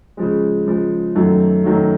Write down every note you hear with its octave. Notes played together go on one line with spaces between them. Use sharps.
C#3 F3 G#3
C#3 F3 G#3
F#2 D#3 F#3 A3
F#2 D#3 F#3 A3